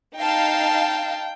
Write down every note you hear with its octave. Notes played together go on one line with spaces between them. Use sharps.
D#4 F5 G5 A5